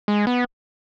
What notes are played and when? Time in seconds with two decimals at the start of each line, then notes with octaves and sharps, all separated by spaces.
0.08 G#3
0.27 B3